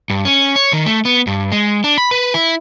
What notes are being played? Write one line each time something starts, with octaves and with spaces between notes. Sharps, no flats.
G2
C#4
C#5
D#3
A3
B3
G2
G#3
D4
B5
B4
E4